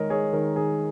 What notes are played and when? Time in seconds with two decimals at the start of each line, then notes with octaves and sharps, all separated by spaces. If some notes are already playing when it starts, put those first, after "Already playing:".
Already playing: D#3 G#3 A#4 C#5 D#5
0.10 G#3 G#4 C#5
0.33 D#3 A#4
0.56 D#3 G#4